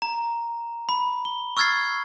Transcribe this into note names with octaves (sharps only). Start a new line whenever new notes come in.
A#5
B5
G7
C#6 E6 F6 G#6 A6 C7